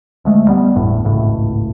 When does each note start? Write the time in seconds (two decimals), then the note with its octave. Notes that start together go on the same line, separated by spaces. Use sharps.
0.25 D2 G#3 A3
0.49 G3 B3
0.75 G1 E2 A2
1.05 G#1 C#2 A2